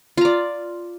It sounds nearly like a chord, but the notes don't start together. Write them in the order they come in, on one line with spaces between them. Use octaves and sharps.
F4 A#5 D5